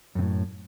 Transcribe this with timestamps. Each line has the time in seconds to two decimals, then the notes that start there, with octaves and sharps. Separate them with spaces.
0.15 F#2
0.19 C3
0.22 A2